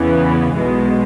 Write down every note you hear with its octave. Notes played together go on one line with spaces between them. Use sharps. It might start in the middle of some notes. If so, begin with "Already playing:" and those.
Already playing: E2 C#3 E3 B3
B1 B2 G#3